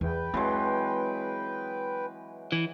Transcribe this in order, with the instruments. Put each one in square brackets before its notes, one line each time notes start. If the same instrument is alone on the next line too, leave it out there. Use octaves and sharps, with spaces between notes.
[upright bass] E2 [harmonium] B4 G5
[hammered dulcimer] E3 F#3 G#3 [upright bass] C4
[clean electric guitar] E3